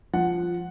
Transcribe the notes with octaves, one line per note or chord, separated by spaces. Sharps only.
F3 F#5